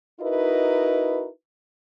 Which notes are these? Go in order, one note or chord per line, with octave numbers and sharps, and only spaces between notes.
D#4 E4 F#4 A#4 B4 D#5